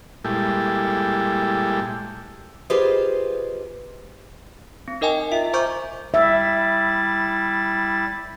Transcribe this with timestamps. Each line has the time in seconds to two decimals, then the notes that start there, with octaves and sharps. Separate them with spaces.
0.25 A#2 G3 G#3 E4 G4 A4
2.70 F4 G4 G#4 B4 C5 D#5
4.88 C4
5.01 D#4 A#4 D#5 G5 G#5
5.32 F4 E5
5.53 C5 E5 A#5 C#6 D6 G6
6.14 G3 E4 E5 A6